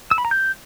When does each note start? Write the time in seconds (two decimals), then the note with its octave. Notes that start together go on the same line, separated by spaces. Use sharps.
0.11 E6
0.18 B5
0.25 A#5
0.31 G6